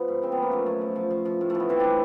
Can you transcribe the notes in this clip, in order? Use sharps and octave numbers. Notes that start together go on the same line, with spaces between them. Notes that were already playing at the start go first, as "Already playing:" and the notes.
Already playing: F3 B3
G#2
C#3 C4
F3 B3
A#3
F#2 A3
F#2
F3
F3
F3
F3
A2
E3 A3
B3
E3 C4
E3 D4